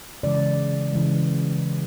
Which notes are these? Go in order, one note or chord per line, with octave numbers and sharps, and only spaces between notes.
C#3 E3 G#3 D5
C#3 E3 G#3